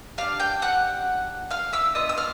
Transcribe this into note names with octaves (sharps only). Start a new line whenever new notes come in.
D4 G4 F5 F6
G5 G6
F#5 F#6
F5 F6
E5 E6
B3 D4 F4 D#5 D#6
E6
F5 F6